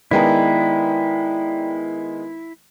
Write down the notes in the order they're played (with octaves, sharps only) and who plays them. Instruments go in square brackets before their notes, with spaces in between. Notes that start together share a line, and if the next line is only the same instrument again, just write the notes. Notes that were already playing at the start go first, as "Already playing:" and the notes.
[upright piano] D#3 G#3 B3 [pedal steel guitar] E4 [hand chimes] D5 G5 A#5